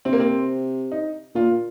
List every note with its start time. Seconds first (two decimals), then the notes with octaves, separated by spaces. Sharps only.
0.05 C3 C4
0.13 A#3
0.20 C4
0.92 D#4
1.35 A#2 F4